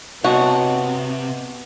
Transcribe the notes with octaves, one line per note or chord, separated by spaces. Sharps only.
C3 B3 F#4 C#5 D#5 A5